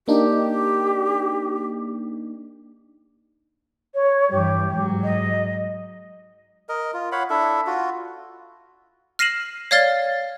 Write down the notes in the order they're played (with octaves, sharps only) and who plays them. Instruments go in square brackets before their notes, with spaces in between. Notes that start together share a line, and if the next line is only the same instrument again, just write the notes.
[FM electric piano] A#3 D4 D#4 [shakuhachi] G4
[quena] C#5
[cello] G2 E3 [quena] G4
[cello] G#2 F#3
[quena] D#5
[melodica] A#4 D#5
F4
C#5 F5 F#5 B5
D4 E4 A4 E5
F4 F#4
[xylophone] F6 A#6 C7 D#7 E7 F#7
C#5 D5 F5 F6 A6 G7